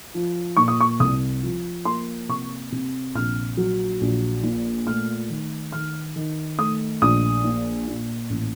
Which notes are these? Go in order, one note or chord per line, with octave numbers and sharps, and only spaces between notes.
F3
A#2 C#6
D#6
C#6
C2 D#6
F3
A#3 C6
C3 C#6
C3
A#1 F6
F#3
A#1
A#2
A3 F6
D#3
D#3 F6
D#3
A3 D#6
A#1 D#6
A#2
A#2
A1